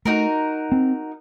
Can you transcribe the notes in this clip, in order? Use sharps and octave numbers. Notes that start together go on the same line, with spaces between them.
A3 D#4 F#4 A#4
C4